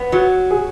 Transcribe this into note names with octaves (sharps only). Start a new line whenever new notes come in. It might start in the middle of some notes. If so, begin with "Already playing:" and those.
Already playing: B3
F#3 F#4
G#4